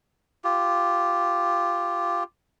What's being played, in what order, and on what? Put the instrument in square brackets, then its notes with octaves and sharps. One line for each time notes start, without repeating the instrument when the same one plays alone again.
[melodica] F4 G4